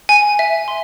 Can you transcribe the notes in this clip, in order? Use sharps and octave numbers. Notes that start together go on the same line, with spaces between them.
G#5
E5
C6